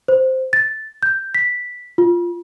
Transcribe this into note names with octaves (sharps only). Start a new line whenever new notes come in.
C5
A6
G6
B6
F4